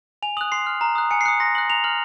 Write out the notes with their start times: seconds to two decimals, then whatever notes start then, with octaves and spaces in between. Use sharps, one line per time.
0.22 G#5 F7
0.37 D#6 F#6 F#7
0.52 C6 C7
0.66 F6
0.81 A#5
0.95 D#6 F#6
1.11 G#5 C#7
1.21 C7
1.26 D#6 F#6 C#7
1.40 C6 A#6
1.55 D#6 F#6 F#7
1.70 A#5 F7
1.84 F6 F#7